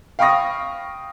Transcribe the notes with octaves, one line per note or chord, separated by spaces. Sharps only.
F5 G5 B5 C#6 D#6 A#6